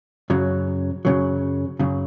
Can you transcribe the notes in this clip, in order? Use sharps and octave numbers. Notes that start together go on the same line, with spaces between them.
F#2 C#3 F#3
F#2 C#3 F#3
F#2 C#3 F#3